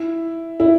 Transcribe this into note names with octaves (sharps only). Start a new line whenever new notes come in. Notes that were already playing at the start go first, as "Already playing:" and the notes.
Already playing: E4
E4